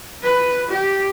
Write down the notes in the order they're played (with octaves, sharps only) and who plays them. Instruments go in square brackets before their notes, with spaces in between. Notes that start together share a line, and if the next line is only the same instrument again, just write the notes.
[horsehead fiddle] B4
G4